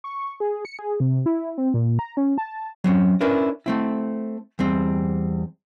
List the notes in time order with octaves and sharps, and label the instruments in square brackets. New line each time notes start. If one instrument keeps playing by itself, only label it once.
[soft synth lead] C#6
G#4
C#7
G#4
C3
E4
C4
A#2
A#5
C#4
A5
[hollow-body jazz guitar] F#3 C4 C#4
C#4 D4 E4 A#4 B4
A3 C4 E4
E2 G3 C4